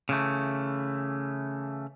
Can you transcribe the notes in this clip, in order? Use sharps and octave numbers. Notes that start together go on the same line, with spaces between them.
C#3 E3 A3